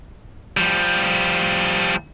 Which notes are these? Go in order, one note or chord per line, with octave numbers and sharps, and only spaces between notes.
F3 G3